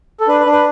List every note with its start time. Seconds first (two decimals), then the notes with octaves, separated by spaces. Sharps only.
0.20 A4
0.28 D4 B4
0.40 B4
0.46 D4
0.52 B4